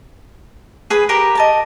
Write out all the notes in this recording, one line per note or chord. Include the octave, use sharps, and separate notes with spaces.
G#4 B4 D#6
G4 A#4 B4
D#5 A5 A#5